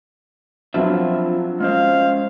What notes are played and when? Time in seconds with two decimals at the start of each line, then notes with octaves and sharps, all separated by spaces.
0.74 F3 F#3 C4 D4 F4 E5
1.60 G#3 C#4 C5 F5